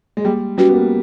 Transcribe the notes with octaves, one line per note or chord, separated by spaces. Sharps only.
G#3
G3 A#3
G3 C#4 F#4 B4
B3
A#3